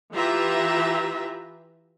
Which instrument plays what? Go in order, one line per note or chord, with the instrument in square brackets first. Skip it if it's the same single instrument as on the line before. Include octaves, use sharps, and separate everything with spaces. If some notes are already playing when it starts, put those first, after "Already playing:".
[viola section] E3 F4 G4 B4 E5 A#5